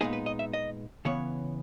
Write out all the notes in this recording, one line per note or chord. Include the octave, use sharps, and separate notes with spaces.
A#2 G#3 B3 D#4 G#4
B4
D#5
E5
D#5
C#3 E3 B3 C#5